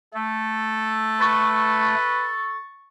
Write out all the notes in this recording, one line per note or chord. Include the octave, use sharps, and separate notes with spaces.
A3 A4
B4 C#6 A6